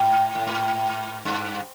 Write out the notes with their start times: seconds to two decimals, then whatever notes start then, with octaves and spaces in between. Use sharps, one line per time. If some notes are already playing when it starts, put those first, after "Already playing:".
Already playing: G#2
0.35 A2
0.47 G#2
1.25 G2